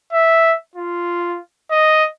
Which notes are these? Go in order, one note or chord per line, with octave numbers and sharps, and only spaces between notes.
E5
F4
D#5